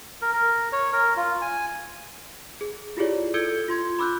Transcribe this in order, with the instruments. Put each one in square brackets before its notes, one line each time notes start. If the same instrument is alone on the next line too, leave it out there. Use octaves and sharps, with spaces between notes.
[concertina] A#4
A#4
C#5
A#4
F4
G#5
[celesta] G#4
E4 F4 G4 G#4 C#5 D5
A4 E6 G6 G#6 C#7 G7
F4 C6 G#6
B5 D6 E6 F#6 G6